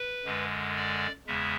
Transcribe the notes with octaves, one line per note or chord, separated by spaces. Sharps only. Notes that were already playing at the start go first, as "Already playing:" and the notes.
Already playing: B4
F#2 D3 G#3
D5
E2 C#3 G#3 E5